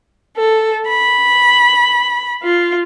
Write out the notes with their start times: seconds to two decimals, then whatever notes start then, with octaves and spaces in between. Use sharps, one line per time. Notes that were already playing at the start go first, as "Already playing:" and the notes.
0.37 A4
0.88 B5
2.43 F4